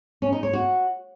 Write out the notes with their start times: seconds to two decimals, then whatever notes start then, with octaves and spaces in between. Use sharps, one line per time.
0.22 C#4
0.32 D#4
0.43 C#5
0.53 F#4